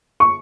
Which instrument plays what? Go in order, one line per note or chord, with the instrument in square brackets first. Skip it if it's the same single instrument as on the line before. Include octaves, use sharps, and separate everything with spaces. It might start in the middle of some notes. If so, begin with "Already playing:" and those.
[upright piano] C#6